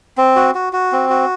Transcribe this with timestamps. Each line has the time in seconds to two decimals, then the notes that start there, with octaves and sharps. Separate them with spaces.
0.18 C4
0.36 F#4
0.55 F#4
0.73 F#4
0.92 C4
1.10 F#4